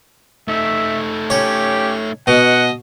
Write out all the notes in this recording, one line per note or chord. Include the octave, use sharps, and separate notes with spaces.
A3 D#4 E5
C#4 G4 C#5
B2 D#5 F#5